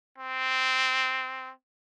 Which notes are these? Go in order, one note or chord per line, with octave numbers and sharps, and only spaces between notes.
C4